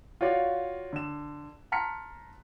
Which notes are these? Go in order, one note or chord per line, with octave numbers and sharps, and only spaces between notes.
F4 F#4 C#5 D5 F5
D3 E7
A5 A#5 C6 F6 B6 C#7